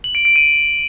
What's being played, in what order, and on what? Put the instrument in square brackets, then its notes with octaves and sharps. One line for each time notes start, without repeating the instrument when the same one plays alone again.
[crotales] F#7
D7
D7
D#7